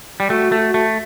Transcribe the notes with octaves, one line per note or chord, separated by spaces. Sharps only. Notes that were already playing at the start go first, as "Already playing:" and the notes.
G3
A3 F#4
A3
F#4
A3